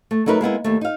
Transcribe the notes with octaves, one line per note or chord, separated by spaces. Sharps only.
A3
F#3 A3 D#4 A#4 B4
G#3 A#3 B3 E4
D#2 A3
D#4 F5